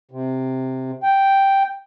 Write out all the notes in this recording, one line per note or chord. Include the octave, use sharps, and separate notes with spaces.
C3
G5